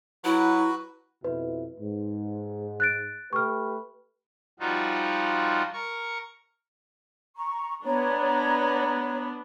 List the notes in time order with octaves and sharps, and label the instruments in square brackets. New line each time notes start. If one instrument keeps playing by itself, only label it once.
[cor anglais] F#3 [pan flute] E4 [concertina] F#4 B4
[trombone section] F2 B2 E4 [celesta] B4
[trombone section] G#2
[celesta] F#6 A6 D7
[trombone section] A3 G4 B4 [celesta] C#6 F6
[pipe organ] F3 G3 D#4 F4 F#4
A#4 C#6
[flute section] A#5 C#6
[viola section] B3 D4 [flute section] C#5 A#5